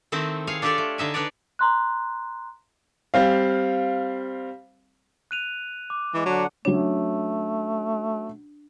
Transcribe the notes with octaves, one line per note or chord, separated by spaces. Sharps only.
D#3 A3 C4 D#4 E4
G#4 C#5 F5
D4 F4 G4 A4 C#5 D5
A3
D3 D#4 E5 G#5
D4 D#4 B4 C#5 D5
A#5 C6 F#6
G3 C4 F5
F#6 D#7 F7
D6
E3 G#3
D3 F#3 D4 F#5
F#3 A3 C#4 D4